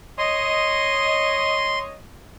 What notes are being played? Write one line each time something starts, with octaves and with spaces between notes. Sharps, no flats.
C#5 D#5 C6